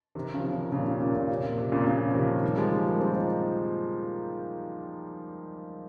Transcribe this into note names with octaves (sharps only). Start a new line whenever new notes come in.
C3 D#3
C#3 F3
C3 D#3
A#2 C#3
C3
A#2 C#3
A#2 C#3
C3
A#2
C3
A#2 C#3
A#2 C#3
F3
C3 D#3
D#3 G3
F3 G#3
G3 A#3
G3 A#3
G#3 C4
F4
C4 D#4